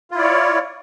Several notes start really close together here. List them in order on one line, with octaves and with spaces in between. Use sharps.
F4 E4 D5 C#5